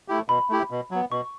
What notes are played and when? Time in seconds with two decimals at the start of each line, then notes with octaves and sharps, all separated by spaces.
0.08 A3 E4 G4
0.29 B2 B5
0.49 A3 E4 G4
0.71 B2
0.91 F#3 B3
1.11 B2 C#6